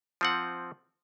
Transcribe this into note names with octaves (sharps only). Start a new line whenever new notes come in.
F3 C4 F#5